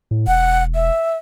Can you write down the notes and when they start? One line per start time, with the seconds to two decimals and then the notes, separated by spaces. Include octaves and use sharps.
0.11 A2
0.27 E1 F#5
0.74 E5